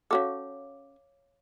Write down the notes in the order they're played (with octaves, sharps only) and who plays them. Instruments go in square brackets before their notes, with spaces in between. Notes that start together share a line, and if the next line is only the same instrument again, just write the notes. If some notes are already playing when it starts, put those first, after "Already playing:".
[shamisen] C#4 F#4 A4 [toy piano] C#5 F5 D6